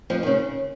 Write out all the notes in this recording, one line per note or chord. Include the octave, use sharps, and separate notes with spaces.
F2 F3
D#3
C#3